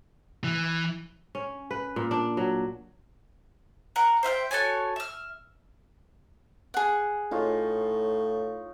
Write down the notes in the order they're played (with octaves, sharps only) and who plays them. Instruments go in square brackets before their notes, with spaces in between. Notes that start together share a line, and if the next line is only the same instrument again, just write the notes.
[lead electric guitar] E3
[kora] C#4
B4
A#2
D4
F#3
[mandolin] A#4 F#5
C5 E5 F5 G5
F#4 A4 C#5 G#5
E5 F6
[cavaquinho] G#4 F#5
[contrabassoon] A2 [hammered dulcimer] D#4 F4 C#5